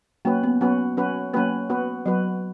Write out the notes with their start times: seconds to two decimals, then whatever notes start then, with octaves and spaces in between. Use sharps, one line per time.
0.25 F#3 A#3 C#4 F#4 B4
0.43 B3
0.61 F#3 B3 C#4 F#4 B4
0.97 F#3 C#4 F#4 B4
1.33 F#3 A#3 C#4 F#4 B4
1.70 B3 F#4 B4
2.06 F#3 B3 F#4 B4